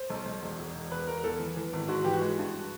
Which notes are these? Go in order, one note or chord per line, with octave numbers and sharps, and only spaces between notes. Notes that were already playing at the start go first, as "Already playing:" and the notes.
Already playing: C5
B1
B1
E1
E1
E1
E1 B4
E1 A#4
E2 A4
E3
E3
G#1
G#2 F#4
E3 G4
F#4
G#3
G2